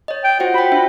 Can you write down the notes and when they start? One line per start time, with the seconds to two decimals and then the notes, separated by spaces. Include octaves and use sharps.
0.08 C#5 D#5
0.24 G5
0.40 F4 F#4 C5 F#5
0.54 F#4 G5 B5
0.72 D4 F4 E5